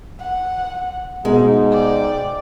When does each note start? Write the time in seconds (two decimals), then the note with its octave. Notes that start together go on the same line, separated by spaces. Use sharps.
0.19 F#5
1.25 G#2 B2 G#3 D#4
1.71 D5 G5